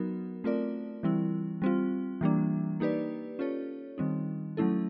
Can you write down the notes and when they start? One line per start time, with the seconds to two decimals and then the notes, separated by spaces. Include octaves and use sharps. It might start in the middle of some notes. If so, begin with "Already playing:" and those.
Already playing: F#3 B3 D#4 F#4 A#4
0.44 A3 C4 F4 A#4 D5
1.03 E3 G3 C4 E4
1.62 G3 C4 F4
2.21 E3 G3 A#3 D4
2.80 A#3 D#4 G4 B4 D5
3.39 C#4 F4 A4 C#5
3.98 D#3 G3 C4 D#4
4.57 F#3 A3 C#4 E4 A4